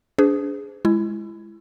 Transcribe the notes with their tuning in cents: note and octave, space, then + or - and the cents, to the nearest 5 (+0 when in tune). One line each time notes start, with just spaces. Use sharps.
D4 -25 G#4 +0 C5 -45
G#3 +0 E4 +20